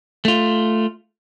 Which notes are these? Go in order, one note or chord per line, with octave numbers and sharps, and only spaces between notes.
A3 F4